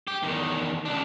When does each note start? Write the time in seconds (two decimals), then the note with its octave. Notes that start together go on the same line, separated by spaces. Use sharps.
0.08 G4
0.23 E2 D#3
0.85 C#2 D4